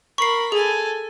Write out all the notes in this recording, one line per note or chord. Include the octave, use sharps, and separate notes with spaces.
A#4 B5 C#6 C7
G#4 A4 G#5